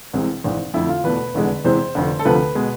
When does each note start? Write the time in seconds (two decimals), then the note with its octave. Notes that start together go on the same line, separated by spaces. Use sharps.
0.13 C2 C3 E3 G#3
0.44 G#1 G#2 E3
0.74 F2 D3 A3 E4
0.89 F4
1.04 E2 B2 A3 B4
1.34 F1 E2 D3 G#3
1.65 E2 C3 E3 G#3 C5
1.95 F1 F2 D3
2.19 A4
2.25 D2 C3 F3 A3 B4
2.55 B2 G#3